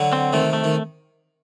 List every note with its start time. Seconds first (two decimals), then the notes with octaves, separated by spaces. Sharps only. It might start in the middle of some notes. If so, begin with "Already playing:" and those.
Already playing: D3 F#3
0.13 C4
0.33 C3 D#3 A3
0.53 A3
0.64 D#3